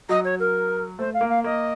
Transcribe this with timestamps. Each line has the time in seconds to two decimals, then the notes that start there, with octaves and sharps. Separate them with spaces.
0.09 F#3 D#5
0.24 C#5
0.39 A#4
0.99 A3 C5
1.14 F5
1.21 A#3
1.29 F5
1.44 A#3 D#5